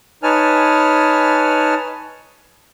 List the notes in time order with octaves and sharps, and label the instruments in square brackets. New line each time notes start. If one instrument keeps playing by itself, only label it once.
[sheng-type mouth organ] D#4 B4 C#5 G#5 A5 F6